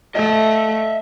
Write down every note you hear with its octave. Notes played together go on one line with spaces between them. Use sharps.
A3 D#5 E5